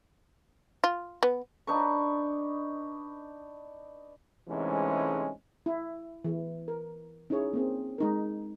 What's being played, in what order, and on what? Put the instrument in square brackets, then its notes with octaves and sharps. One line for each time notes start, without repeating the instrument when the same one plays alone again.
[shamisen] F4
B3
[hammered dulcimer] D4 D#4 B4 C#6
[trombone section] G#2 C3 E3 G#3 A3 C#4
[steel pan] E4
E3
A#4
C#4 D#4 E4 G#4 C#5
A#3 C4 G#4
G#3 D#4 A#4